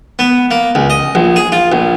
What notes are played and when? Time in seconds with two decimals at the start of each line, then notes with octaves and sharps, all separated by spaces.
0.19 B3
0.51 A#3
0.75 C#2
0.90 D#5
1.15 A#1
1.36 G#4
1.52 F4
1.72 A#1